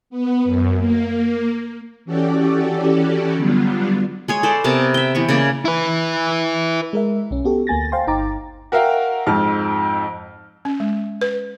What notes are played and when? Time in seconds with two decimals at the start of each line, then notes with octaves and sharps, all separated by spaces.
0.10 B3
0.44 F#2
0.77 A#3
2.05 E3 C#4 F#4 G4 A4 D5
3.36 D3 F#3 G3 B3 D4 F4
4.28 G#3 G#4 C#5
4.43 A4 B4 C5 D5
4.64 C3 B3 A#4 A5
4.94 E5 G5
5.15 E3 B3 C#6
5.29 C#3 A#3 D5
5.65 E4 B4
6.93 G#3 A#4 E5
7.31 B1 C#4
7.45 B3 F#4 G4 A4
7.67 D2 A#3 G#5 A6 A#6
7.92 C5 F5 G5 C6
8.07 G1 D#4 G5 A#5 D6 A6
8.72 F#4 A#4 E5 F5 G5
9.26 F2 G#2 A5 F6
10.65 C#4
10.80 G#3
11.21 B4